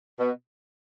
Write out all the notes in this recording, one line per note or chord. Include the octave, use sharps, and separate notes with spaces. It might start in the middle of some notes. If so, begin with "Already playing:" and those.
B2